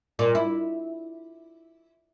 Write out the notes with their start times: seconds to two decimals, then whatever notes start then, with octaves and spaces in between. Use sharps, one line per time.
0.19 A#2
0.35 E4